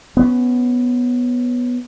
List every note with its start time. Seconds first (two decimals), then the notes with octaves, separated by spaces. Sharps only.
0.17 B3 C#4